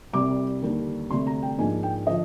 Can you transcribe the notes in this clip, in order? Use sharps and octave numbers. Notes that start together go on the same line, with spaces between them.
C2 C3 G3 D6
D#2 D3 G3 D4
D2 C3 G3 C6
A#5
G5
G#2 F3 A#3 D4 G#5
G5
D3 F3 D#5